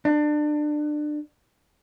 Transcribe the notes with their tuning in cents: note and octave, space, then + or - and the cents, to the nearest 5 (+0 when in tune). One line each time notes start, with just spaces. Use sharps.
D4 +25